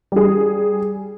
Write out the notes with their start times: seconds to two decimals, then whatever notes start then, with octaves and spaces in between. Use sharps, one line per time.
0.12 G3 G#4